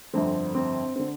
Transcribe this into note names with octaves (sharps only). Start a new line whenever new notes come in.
G1 F2 D3 C4
C4
D3 C4